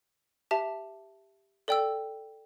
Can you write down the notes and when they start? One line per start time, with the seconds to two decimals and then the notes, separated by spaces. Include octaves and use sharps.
0.51 G4 E5 A5
1.68 A4 D5 G5 E6